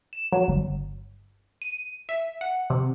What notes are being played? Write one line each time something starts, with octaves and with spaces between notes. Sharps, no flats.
E7
F#3
G1
D#7
E5
F#5
C3